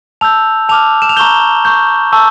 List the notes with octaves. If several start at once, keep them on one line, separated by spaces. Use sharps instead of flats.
A5 E6 G6 F7
A5 D6 F6 F7
E7
F7
A#5 C#6 G6 G7
C#6 G6
A5 C#6 E6